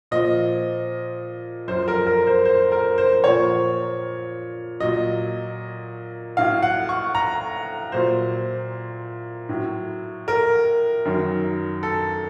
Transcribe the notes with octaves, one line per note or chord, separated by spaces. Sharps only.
A#2 F3 D#5
F#2 F3 C5
A#4
A#4
C5
C5
A#4
C5
A#2 F3 C#5
A#2 F#3 D#5
A2 F#3 F5
F#5
C#6
A#5
A#2 F#3 C5
A2 F#3
A#4
F#2 D#3 F#3
A4